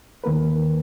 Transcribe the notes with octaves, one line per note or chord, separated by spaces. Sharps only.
D#2 D#3 A#3 A#4 B4